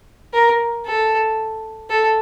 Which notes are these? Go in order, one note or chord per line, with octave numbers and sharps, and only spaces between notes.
A#4
A4
A4